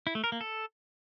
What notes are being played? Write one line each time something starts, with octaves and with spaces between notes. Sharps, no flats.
E4
A3
A#4
A#3
A4